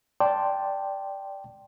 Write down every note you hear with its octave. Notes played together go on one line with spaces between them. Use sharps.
D5 G5 A5 C6